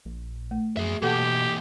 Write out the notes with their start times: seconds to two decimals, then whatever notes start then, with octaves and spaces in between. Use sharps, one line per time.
0.05 A#1
0.51 A3
0.77 F#2 G#4 E5
1.02 B2 E3 A#3 G4 A4 F#5 A5